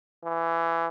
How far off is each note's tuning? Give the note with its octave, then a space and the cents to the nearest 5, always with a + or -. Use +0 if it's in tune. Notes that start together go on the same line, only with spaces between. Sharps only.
E3 +15